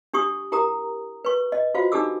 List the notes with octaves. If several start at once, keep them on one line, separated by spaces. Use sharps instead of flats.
D4 G4 C#6 D#6
E4 G4 A#4 A#5 D#6
B4 C#6
D#5
F4 F#4 C5 F5
D4 D#4 G4 A4 D6 E6